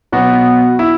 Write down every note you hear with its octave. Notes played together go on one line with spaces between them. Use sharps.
B2 F#3 B3 F#4
E4